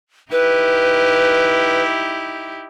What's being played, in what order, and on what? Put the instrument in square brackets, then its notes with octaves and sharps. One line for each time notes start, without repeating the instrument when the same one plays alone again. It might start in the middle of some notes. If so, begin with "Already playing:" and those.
[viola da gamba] D#4 E4 G4 [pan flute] B4